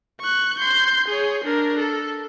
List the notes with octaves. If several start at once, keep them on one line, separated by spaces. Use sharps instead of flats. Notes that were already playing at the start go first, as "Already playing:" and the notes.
C#6 F#6
C6 G6
G#4 C#5
D4 A#4
A4